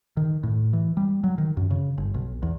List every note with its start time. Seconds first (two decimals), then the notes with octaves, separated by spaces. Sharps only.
0.17 D#3
0.43 A2
0.73 E3
0.97 G3
1.24 F#3
1.38 D#3
1.57 F#2
1.70 C#3
1.98 G1
2.14 B1
2.43 E2